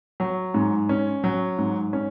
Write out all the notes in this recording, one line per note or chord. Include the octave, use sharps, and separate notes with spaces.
F#3
G#2
C#4
F#3
G#2
C#4